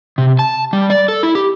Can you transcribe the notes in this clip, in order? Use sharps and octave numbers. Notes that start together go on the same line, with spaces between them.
C3
A5
G3
D5
A4
E4
G4